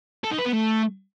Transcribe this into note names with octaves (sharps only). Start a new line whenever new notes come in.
A4
D#4
B4
B3
A3